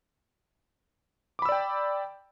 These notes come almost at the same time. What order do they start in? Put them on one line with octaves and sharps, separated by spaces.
D6 B5 E6 D5 G5